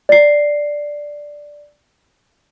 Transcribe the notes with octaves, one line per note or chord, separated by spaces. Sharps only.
D5 C7